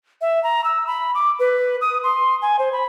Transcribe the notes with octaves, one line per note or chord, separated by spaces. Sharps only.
E5
A#5
E6
B5
D6
B4
D#6
C6
G#5
C5
B5